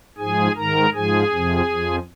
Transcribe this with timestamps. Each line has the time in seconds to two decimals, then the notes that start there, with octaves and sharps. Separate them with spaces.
0.18 G#2 F3 G#4 G#5
0.56 G#2 D#3 A#4 A#5
0.94 G#2 F3 G#4 G#5
1.31 F2 C3 F3
1.68 F2 F3